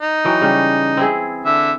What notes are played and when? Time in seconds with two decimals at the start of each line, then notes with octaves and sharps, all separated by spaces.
0.01 D#4
0.25 E3 F#3 G5
0.41 C#3 G3 C#4
0.97 C4 E4 G#4
1.45 D3 E5